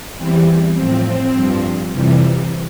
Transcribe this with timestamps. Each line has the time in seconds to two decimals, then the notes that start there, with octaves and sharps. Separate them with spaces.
0.18 E2 E3 G3 C4
0.75 A2 F3 C4
1.33 G2 F3
1.91 F2 C3 E3 G3